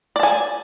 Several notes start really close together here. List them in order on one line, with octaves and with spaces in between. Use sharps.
D5 A5 G#5